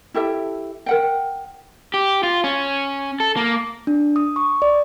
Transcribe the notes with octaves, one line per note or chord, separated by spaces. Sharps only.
E4 G4 A4 E5
A#4 F#5 G5
G4
F4
C#4
A4
A#3
D4
D#6
C#6
D5